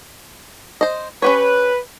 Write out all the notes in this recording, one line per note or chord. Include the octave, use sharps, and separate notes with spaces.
C5 D#5
C#4 G4 B4 C#5